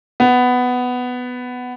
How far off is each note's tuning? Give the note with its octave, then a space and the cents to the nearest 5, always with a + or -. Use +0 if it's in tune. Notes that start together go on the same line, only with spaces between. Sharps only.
B3 +10